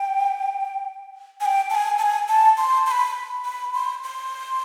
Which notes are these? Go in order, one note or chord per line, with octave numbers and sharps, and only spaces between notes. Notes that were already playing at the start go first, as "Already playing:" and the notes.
Already playing: G5
G#5
G5
A5
G#5
A5
G#5
A5
C6
C6
B5
B5
C6
C6